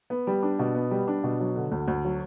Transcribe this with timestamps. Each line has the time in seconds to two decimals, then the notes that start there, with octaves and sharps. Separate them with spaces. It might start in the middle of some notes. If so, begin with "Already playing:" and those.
0.10 B3
0.27 G3
0.43 D4
0.59 B2
0.75 B3
0.91 G3
1.08 D4
1.24 B2
1.40 F#3
1.56 D3
1.72 D2
1.88 D2
2.05 F#3